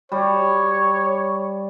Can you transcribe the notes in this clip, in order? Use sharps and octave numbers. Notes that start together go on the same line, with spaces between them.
G3 C#5